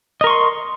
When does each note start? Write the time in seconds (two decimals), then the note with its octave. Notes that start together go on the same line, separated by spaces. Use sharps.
0.21 D#5
0.24 A#4
0.27 C#6
0.30 C6